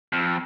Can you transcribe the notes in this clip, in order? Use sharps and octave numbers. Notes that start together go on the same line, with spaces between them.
F2